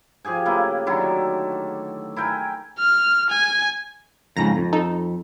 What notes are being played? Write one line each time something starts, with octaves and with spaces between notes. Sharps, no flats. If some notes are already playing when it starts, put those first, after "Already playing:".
F3 G4 G#4 G#5
C#3 A3 A#3 E4
D3 D#3 F#3 E4
E4 A#4 G5 G#5
F6
G#5
F2 G#2 C#3 A#5 A#6
F2
D#4 A4